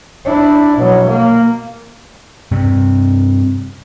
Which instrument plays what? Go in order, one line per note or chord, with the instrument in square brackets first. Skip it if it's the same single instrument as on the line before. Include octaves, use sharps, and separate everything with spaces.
[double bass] D4 E4
B2 F#3
A#3
[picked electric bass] G2 C3